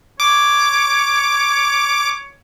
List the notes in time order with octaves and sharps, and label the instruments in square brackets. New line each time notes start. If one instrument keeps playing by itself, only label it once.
[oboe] C#5 [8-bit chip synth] D6